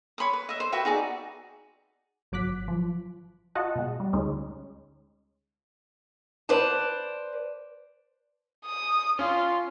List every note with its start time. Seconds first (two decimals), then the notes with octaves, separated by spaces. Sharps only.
0.18 C#5 B5 C6 D#6
0.33 B4
0.49 D#5 E5
0.60 C5
0.72 F#4 B4 E5 G5
0.85 D#4 F#4 G#4 D5
2.32 G#1 F#3 D6 F#6 B6
2.68 F3
3.55 F4 F#4 D#5 F#5 A5
3.75 B2 G#3
4.00 G3
4.13 D2 G#3 C#4 D#4
6.49 B4 C5 D5 A5
8.65 D#6
9.19 C#4 F4